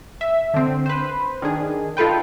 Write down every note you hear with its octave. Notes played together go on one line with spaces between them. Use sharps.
E5
D3 C4
B4 C5
D#3 D4 G#4
D#4 F4 A4 B4 G5